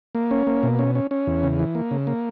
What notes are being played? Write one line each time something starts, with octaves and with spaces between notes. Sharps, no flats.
A#3
C#4
A#3
B2
C#4
C#4
C#4
E2
C#3
E3
A#3
C#3
A#3